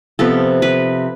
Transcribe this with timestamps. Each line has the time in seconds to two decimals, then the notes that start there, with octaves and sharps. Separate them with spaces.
0.19 C3 F3 B3 A4
0.62 B4